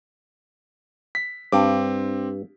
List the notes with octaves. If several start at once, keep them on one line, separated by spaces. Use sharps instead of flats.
B6
G2 C4 D6